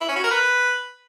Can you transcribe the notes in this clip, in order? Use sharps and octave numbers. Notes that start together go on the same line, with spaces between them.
E4
C#4
F#4
A#4
B4